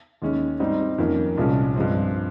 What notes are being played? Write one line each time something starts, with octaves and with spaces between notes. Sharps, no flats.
D#2 D#3 G#3 C#4
G#2 G3 C4 D#4
F2 D#3 A#3 C#4
C2 A#2 F3 G#3 C#4
G2 F3 G#3 C4